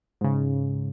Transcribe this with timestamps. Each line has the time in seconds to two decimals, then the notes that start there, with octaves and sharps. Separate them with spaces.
0.21 G#2 C#3